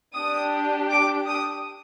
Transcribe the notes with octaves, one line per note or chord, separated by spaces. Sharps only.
D4 G4 D#6
D6
D#6